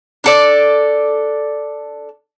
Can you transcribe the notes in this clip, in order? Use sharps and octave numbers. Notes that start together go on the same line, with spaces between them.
D4 A4 D5